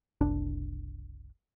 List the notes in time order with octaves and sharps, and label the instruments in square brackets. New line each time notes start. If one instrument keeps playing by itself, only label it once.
[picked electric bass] F#1 C2 D4